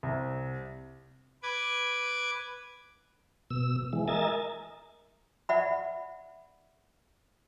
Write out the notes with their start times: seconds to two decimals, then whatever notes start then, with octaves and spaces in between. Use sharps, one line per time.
0.03 C2
1.43 B4 D6 G#6
3.50 B2 E6
3.93 E3 G#3
4.08 A#4 D#5 E5 G#5 A6
5.49 D5 E5 F#5 B5